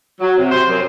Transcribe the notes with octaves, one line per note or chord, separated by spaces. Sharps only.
F#3
C3
C5
F#2